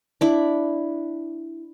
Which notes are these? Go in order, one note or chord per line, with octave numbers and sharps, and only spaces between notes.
D4 E4